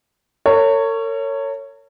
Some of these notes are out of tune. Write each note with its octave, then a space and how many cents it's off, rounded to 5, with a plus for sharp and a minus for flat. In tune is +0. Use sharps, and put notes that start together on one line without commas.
A#4 -45 C#5 +0